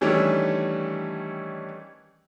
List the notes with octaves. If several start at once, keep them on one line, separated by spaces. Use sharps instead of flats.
D#3 E3 G3 A3 C#4 D4